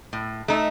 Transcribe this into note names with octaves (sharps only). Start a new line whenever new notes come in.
A2
A3 D#4